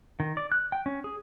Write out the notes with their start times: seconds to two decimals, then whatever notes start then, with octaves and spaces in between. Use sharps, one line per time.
0.20 D#3
0.37 D5
0.52 F#6
0.72 G5
0.86 C#4
1.04 G#4